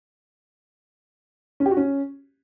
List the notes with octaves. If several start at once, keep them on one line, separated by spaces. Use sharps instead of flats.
C#4
G4
F#4
C#4